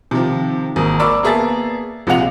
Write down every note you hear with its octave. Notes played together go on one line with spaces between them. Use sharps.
C3 D#3 F3
G#1 A#3 D#6
A#4 D5 B5 C#6 D6 E6
A#3 B3 G#4 E5 A5 A6
A#1 C3 G#3 F4 F#5 F7